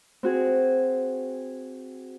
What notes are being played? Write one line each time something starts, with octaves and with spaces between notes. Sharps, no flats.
C4 F#4 G#4